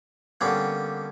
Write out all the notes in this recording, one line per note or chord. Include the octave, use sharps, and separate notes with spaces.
D3 G3 A#3 B3 C#4